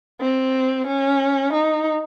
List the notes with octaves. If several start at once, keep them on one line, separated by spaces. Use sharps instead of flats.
C4
C#4
D#4